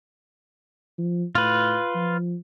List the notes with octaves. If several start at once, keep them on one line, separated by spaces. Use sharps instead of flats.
F3
A2 F4 B4
F3